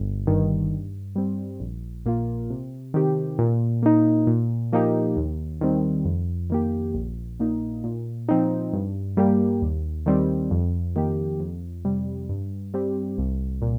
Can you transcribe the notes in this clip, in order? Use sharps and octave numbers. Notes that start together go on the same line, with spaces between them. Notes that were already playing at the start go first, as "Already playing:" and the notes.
Already playing: G1
G2 D#3
G2
G3 C4
A#1
A#2 A#3 F4
C3
D#3 C4 G4
A#2
A#3 D#4
A#2
F3 A#3 D#4 G4
D#2
D#3 G3 C4
F2
D#3 A#3 G4
A#1
A#2 A#3 D#4
A#2
F3 C4 D#4
G2
G3 A#3 G4
D#2
D#3 G3 C4
F2
D#3 A#3 G4
F2
C3 G3
G2
G3 C4 G4
C2
A#2